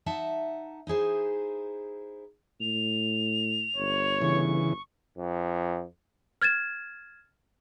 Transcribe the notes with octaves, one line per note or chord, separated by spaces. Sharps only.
D#4 E5 F#5 A5
D#4 E4 G#4 C5
A2 F7
G1 C#5
C#3 E3 C#6
F2
F6 G#6 A6 E7